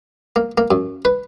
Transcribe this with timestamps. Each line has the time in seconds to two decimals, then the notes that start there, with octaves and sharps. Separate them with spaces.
0.36 A#3
0.58 A#3
0.71 F#2
1.05 B4